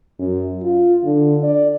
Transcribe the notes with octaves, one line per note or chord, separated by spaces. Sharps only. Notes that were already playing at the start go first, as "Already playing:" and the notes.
F#2
F4
D3
D5